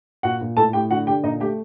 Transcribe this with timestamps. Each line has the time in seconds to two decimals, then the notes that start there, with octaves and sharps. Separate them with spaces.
0.23 A#2 F#4 F#5
0.41 A#2
0.57 A2 A4 A5
0.73 A2 G4 G5
0.91 D3 F#4 F#5
1.07 D3 G4 G5
1.23 A#2 D#4 D#5
1.40 A3 G4 G5